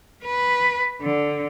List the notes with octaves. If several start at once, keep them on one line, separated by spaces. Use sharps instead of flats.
B4
D3